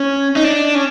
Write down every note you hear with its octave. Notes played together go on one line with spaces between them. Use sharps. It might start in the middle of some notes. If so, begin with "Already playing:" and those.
Already playing: C#4
D#4
D4
C#4